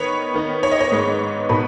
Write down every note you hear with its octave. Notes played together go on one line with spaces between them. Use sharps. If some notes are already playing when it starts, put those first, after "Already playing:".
Already playing: D#3 B3 D#4 B4 C#5
D#3 B3 D#4
C#5
D#5
C#5
G#2 G#3 B3 D#4
B2 B3 D#4 B4